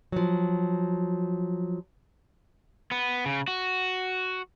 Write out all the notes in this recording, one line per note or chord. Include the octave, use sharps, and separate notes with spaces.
F3 F#3
B3
C#3
F#4